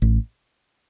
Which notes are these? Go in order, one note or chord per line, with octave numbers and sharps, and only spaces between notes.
A1